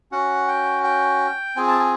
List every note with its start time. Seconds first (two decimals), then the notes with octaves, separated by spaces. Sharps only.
0.12 C#4 F#4 F#5
0.48 G5
0.83 G5
1.56 C4 F4 G#4 G#5
1.68 A5
1.80 G#5